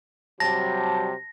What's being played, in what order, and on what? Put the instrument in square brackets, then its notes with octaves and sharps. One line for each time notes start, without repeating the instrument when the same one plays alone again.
[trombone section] C3 F#3 G3 [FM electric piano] A5 [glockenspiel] A#6